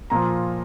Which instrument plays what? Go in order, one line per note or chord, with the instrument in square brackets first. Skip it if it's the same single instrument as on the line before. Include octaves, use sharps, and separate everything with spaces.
[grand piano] A#2 F3 A#5